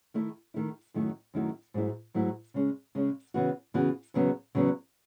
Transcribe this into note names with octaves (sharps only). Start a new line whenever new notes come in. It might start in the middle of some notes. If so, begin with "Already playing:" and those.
D#3 A3 E4
D#3 A3 E4
F#2 D#3 F#3 A3 E4
F#2 D#3 F#3 A3 E4
G#2 F#3 A3 E4
G#2 F#3 A3 E4
C#3 G#3 C#4
C#3 G#3 C#4
C#3 E3 B3 F#4
C#3 E3 B3 F#4
E2 C#3 F#3 B3
E2 C#3 F#3 B3